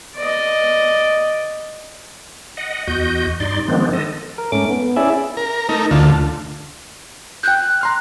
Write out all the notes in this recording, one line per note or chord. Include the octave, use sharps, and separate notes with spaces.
D5 D#5
D#5 F#5
E2 F#4 D#5 G6
G2 D#4 D5 C6
D#3 F3 G#3 B3 C4 D4
A4 D#5
A#4
G#2 A3 C#4 D6
B3
C#4 E4 G#4 D5 E5
A#4
A3 D#4 A#4
D2 D3 A3 F4
G5 F#6 G6
A#5 C6 F6